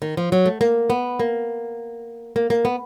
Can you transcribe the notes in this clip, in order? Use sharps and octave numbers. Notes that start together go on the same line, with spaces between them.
D#3
F3
F#3
A3
A#3
B3
A#3
A#3
A#3
B3